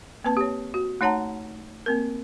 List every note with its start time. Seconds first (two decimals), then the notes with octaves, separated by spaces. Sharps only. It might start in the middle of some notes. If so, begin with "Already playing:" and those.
0.24 A#3 C4 B4 A5
0.37 G4 C#5
0.74 F#4
1.01 A3 D#4 C#5 F#5 A5 A#5
1.86 A#3 C4 A#4